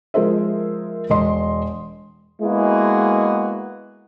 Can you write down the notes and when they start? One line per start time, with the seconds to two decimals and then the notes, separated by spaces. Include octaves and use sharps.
0.14 F3 G#3 G#4 A#4 C5 E5
1.10 E1 D#5 C6
2.42 G#3 A#3 B3 E4 F#4 G#4